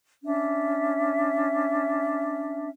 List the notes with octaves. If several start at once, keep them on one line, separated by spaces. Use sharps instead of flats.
C#4 D4 E5